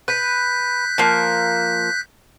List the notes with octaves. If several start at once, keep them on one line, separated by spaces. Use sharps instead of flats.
B4 F#6 G6 B6
F3 A#3